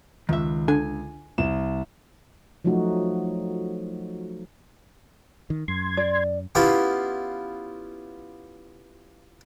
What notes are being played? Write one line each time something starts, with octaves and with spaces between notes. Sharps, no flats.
C#2 D#3 E5
D3 G#5
C2 E7
F3 F#3 A3 D#4 F#4
D#3
F#2 C6 G#6
D5
B3 C#4 E4 F4 G4